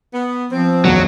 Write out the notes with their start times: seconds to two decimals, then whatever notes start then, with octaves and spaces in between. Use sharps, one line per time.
0.13 B3
0.52 F3 C4
0.85 E1 B1 F#2 F#3